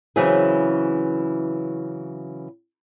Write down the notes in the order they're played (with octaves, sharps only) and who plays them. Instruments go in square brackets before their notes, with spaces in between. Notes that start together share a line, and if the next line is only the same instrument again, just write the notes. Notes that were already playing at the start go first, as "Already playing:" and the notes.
[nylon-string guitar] C#3 E3 F#3 C4 E4 G#4